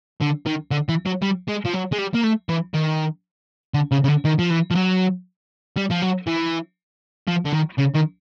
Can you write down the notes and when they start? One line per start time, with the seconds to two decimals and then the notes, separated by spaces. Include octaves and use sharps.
0.21 D3
0.46 D#3
0.71 D3
0.89 E3
1.06 F#3
1.22 G3
1.48 G#3
1.65 F3
1.73 F#3
1.92 G#3
1.98 G3
2.14 A#3
2.23 A3
2.49 E3
2.74 D#3
3.74 D3
3.92 C#3
4.04 C#3
4.08 D3
4.25 D#3
4.39 F3
4.50 E3
4.71 F3
4.75 F#3
5.77 G3
5.90 F3
6.02 F#3
6.27 E3
7.28 F3
7.46 D3
7.53 D#3
7.79 C#3
7.95 D#3